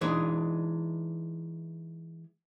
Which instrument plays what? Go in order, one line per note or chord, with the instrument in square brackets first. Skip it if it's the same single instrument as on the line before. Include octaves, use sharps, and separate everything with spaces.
[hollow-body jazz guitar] E3 G#3 D4 D#4